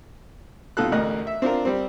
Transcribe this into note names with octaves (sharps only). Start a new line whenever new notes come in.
C2 B2 D#4 F4 A4 F#6
A1 D2 A#4 D#5 F#6
E5
C4 D4 F4 A#4
G3 C4